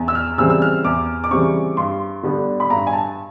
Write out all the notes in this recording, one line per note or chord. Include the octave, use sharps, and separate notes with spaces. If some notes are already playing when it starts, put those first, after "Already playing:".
Already playing: E2
E6
F6
C#3 E3 G3 C4 E6
E6
F6
E2 D6
D6
C#3 E3 G3 C4 C#6
G2 C6
D3 G3 B3 D4
B5
G2 A#5
G#5
A5